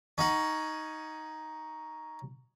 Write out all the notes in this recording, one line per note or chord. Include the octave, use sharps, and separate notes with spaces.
C#4 D#4 F#5